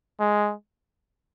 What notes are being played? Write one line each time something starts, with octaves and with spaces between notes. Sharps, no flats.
G#3